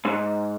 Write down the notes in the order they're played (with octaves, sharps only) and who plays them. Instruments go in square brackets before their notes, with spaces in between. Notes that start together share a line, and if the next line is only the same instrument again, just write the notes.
[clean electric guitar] G#2